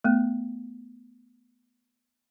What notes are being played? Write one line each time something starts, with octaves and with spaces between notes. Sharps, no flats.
A3 B3